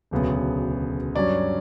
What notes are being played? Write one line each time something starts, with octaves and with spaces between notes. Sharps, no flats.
E1 D2 C#3 F#3 B3
G2 F#3 C#4 D5